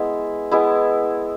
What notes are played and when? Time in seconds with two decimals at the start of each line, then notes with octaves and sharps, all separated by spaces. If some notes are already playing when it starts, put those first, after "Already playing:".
Already playing: G#3 B3 E4
0.51 G#3 B3 E4